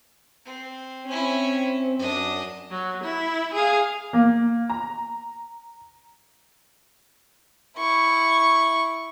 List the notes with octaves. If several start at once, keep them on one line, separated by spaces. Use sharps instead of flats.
C4
C4 C#4 E4
F#2 D4 D#5
F#3
E4
G#4 F5
A#3
A#5
E4 C#6